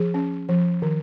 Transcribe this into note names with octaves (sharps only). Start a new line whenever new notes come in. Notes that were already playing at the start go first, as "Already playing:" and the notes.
Already playing: F3 G#4
C#4
F3
D#3